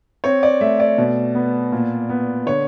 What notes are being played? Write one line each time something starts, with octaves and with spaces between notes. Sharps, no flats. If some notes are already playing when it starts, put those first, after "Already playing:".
C4 C#5
D5
A3 E5
D5
B2
B3
A#2
B3
D3 C#5